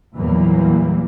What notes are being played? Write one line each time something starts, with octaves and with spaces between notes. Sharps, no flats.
E2 A#2 E3 F#3 G3 A#3